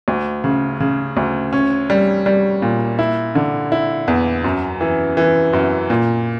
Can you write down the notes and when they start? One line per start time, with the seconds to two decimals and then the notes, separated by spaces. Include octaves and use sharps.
0.08 D2
0.44 C#3
0.80 C#3
1.17 D2
1.53 C#4
1.90 G3
2.26 G3
2.62 A#2
2.99 E4
3.35 D3
3.72 E4
4.08 E2
4.44 F#2
4.81 E3
5.17 E3
5.53 F#2
5.90 A#2